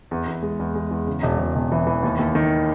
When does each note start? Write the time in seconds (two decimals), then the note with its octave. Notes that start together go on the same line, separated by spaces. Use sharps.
0.11 E2
0.28 E2
0.43 G#3
0.59 E2
0.75 G#3
0.91 E2
1.07 C#3
1.23 E1
1.39 E1
1.55 E1
1.72 E3
1.87 E3
2.03 D#2
2.19 D#2
2.35 D#3